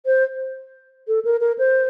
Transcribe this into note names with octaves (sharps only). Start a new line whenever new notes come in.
C5
A4
A#4
A#4
C5